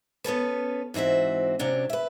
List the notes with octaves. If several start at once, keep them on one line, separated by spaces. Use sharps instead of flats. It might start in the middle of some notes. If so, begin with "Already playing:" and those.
B3 C#4 A4 B4
G#2 E3 C4 F#4 E5
C3 F#3 C#4 D4
B4 E5